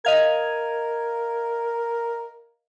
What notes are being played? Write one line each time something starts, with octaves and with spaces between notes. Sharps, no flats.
A#4 D#5 F5 G#6